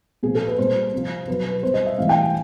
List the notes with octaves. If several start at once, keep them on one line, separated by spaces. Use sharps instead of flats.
A#2 F3 G#4
A4
B4
A#2 G3 C5
C3 F3
B2 F#3 B4
B4
B2 G3 C5
D#5
E5
A2 E3 G3 F5
G5
G#5